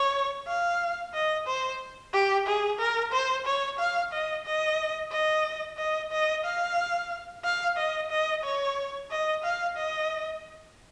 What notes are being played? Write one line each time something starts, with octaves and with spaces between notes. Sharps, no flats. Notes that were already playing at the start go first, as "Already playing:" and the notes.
Already playing: C#5
F5
D#5
C5
G4
G#4
A#4
C5
C#5
F5
D#5
D#5
D#5
D#5
D#5
F5
F5
D#5
D#5
C#5
D#5
F5
D#5